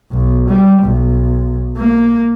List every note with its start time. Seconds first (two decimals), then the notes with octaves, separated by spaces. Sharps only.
0.11 B1
0.49 G3
0.83 B1
1.77 A#3